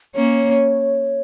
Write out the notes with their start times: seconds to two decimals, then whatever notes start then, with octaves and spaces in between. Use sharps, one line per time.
0.15 A#3 C#4 C#5